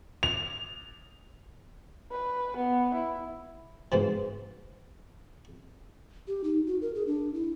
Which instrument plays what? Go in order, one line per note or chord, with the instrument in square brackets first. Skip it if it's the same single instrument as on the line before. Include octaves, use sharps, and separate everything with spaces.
[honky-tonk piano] F7
[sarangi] B4
B3
E4
[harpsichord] G#2 B2 F3
[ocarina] G4
D#4
F#4
A#4
G#4
D4
E4